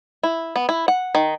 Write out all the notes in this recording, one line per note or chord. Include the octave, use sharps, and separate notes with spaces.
E4
B3
E4
F#5
D#3